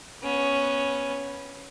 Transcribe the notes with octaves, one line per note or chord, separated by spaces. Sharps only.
B3 C#4